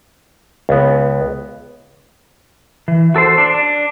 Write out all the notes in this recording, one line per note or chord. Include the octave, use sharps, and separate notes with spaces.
C#2 B3
E3
F#4 A4 A#4 C5
D4
D4